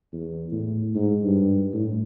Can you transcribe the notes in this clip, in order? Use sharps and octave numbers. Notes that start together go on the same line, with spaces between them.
E2
A2
G#2
G2
A2